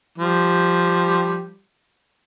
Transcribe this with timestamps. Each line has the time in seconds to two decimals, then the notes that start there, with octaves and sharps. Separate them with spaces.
0.18 F3 G3